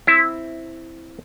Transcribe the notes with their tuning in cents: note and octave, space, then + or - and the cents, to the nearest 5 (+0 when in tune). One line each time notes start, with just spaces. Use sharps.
C4 +0 E4 +0